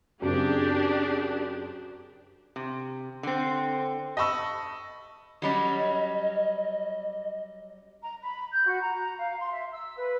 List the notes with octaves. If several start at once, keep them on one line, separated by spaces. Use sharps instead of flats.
F#2 C#3 C4 D4 G4 G#4
C3
D3 C4
D#5 A5 B5 C#6 E6
F#3 G3 C#4 D#5
A#5
B5
G6
F#4
A#5
F5
C6
E5
E6
B4